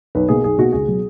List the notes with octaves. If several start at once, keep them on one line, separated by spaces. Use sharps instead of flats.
B1 B4
B2 A#3 G#4
B1 G#4
B2 A#3 F#4
C#2 G#4
B2 F#3